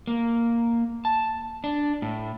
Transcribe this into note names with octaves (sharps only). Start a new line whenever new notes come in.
A#3
A5
D4
A2